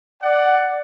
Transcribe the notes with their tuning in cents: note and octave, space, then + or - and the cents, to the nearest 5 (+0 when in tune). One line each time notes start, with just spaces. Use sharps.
D5 +5 F#5 +10